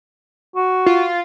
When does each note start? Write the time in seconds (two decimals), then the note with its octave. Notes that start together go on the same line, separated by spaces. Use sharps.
0.56 F#4
0.86 F4